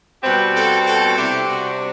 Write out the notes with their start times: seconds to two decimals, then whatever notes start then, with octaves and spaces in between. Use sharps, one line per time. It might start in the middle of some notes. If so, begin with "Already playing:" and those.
0.23 B2 G3 C4 G4 B4
0.54 F#4 A4
0.85 F#4 A4
1.16 C3 G3 D4 E4 G4
1.48 F#4